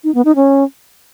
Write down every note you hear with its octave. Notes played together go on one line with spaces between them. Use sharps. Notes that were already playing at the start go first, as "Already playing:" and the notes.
D#4
B3
D#4
C#4